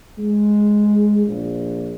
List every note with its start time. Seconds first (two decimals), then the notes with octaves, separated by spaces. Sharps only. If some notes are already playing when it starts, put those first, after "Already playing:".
0.18 G#3
1.27 A#1